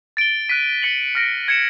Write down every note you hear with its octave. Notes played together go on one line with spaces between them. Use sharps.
A6 D7 G7
F#6 B6 D#7
A6 C#7 F#7
F6 A#6 D7
G#6 C#7 E7